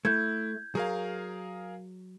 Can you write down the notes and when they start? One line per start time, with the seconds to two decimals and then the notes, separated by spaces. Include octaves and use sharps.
0.05 A3 E4 G6 G#6
0.75 F#3 G#4 A#4 F5